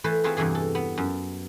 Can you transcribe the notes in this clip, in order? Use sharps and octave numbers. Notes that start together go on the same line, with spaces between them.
E3 A3 A4 B4 C5
A3 C4 F4 G#4 B4
E2 G2 C3 E3 G#4
A4
B3
F#2